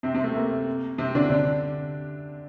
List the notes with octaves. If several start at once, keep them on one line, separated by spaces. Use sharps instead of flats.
C3 C4
C3 C4
A3
A#3
C3 C4
D3 D4
D3 D4